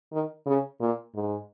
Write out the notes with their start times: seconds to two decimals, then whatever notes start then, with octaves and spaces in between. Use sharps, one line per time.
0.13 D#3
0.46 C#3
0.81 A#2
1.15 G#2